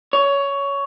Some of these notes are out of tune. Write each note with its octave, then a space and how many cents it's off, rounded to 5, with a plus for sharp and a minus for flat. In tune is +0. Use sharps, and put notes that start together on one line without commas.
C#5 +15